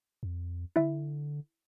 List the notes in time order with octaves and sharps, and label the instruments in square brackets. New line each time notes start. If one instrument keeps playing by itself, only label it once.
[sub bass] F2
[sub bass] D3 [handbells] E4 E5